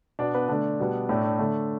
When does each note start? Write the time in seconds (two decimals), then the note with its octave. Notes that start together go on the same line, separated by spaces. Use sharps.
0.19 B2 B3 D4 D5
0.34 B3 B4
0.49 D3 A3 D4 D5
0.79 B2 G3 B3
1.09 A2 A3 D4 D5
1.24 D4 D5
1.39 D3 A3